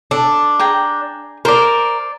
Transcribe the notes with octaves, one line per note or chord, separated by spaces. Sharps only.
D4 A4
G#4 G5 A#5
A#4 C5 D5